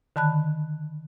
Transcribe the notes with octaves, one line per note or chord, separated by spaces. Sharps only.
D3 D#3 A5 B5 F#6